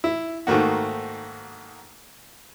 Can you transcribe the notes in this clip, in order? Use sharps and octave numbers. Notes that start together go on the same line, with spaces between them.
E4
G#2 D#3 A3 A#3 F#4